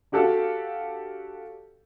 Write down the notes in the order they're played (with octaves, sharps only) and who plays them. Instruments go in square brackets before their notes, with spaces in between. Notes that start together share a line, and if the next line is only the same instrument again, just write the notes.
[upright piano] D4 F#4 G4 A4 F5